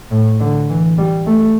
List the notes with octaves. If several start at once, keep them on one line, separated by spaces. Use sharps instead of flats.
A2
D3
E3
G3
A3